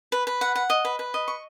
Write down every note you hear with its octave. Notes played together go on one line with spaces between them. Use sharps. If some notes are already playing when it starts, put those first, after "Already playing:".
B4
B4
F#5
F#5
D#5
B4
B4
D#5
C#6